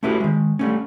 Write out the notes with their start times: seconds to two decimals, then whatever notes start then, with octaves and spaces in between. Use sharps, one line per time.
0.03 A3 C#4 E4 F#4 G4 B4
0.20 D#3 G#3
0.59 G3 A3 C#4